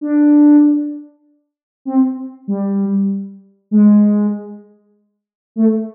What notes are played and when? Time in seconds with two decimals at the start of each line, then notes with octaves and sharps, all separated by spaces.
0.01 D4
1.85 C4
2.47 G3
3.71 G#3
5.56 A3